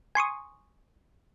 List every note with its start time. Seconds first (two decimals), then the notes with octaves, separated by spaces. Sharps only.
0.15 G#5 C6 C#6 D#6